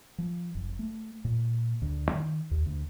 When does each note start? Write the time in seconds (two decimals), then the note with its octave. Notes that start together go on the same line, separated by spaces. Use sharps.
0.18 F3
0.55 F#1
0.79 A3
1.25 A#2
1.82 D2
2.12 D#3
2.51 D#2
2.66 D2